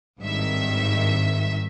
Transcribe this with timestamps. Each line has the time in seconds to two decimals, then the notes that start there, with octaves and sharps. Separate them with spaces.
0.19 G#1 G2 D#3 E5